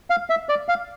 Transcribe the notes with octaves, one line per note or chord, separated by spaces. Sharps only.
F5
E5
D5
F5